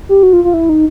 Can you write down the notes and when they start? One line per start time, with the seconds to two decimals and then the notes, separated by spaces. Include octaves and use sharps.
0.09 G4
0.23 F#4
0.33 F4
0.44 F4
0.54 E4
0.69 D#4